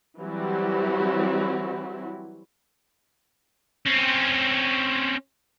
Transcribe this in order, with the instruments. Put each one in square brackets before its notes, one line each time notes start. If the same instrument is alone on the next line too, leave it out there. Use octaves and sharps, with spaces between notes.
[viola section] E3 F#3 G3 C4 E4 F#4
[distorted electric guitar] C4 C#4